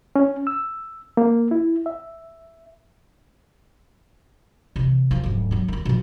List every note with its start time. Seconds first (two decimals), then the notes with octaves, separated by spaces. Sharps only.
0.16 C#4
0.47 E6
1.17 A#3
1.51 E4
1.86 E5
4.76 C3 E3
5.11 F3 A#3
5.24 D1 G#2
5.51 F#3 B3
5.68 D#3 C#4
5.85 B2 F3